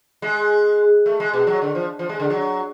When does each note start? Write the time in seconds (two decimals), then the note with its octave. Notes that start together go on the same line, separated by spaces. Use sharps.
0.22 G#3
1.06 A3
1.20 G#3
1.34 B2
1.47 F#3
1.62 D3
1.75 F3
1.99 F3
2.09 G#3
2.20 D3
2.30 F#3